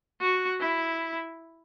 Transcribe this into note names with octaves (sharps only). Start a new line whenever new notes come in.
F#4
E4